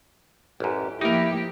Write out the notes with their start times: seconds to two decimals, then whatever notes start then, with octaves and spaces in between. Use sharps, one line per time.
0.60 A1 F#2 G4
1.01 F3 A#3 D#4 E4 G4 A#4